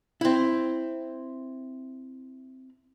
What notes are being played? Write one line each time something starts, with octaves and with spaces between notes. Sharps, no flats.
C4 E4